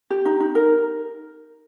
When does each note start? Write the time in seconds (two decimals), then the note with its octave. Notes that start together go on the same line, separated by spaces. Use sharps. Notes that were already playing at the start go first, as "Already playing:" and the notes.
0.10 G4
0.25 D#4
0.40 D#4
0.55 A#4